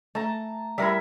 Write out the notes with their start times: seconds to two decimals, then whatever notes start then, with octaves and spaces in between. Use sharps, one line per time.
0.15 A3 A5 A#5
0.78 G3 E4 A#4 E5 F#5